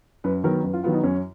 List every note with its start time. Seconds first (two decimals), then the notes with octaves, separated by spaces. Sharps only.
0.24 F#2 B4
0.44 D#3 F#3 B3 A#4
0.64 F#2 B4
0.73 F4
0.84 D#3 F#3 B3 F4
0.93 D#4
1.03 F#2 C#4